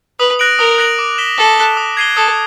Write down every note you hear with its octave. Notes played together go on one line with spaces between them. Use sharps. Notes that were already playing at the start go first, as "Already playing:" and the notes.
B4 D#6
F#6 A#6 D7 F#7
A#4 D#6
F#6 A#6 D7 F#7
D6
F#6 B6 E7 G7
A4 D6
F#6 B6 E7 G7
D#6
G#6 C7 D#7 G7
A4 D#6